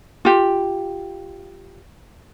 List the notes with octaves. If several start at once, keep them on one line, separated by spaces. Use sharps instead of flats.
F4 G4